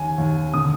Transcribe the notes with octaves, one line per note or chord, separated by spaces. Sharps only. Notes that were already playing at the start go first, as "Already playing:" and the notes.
Already playing: D#2 G#5
D#2
D3 D#6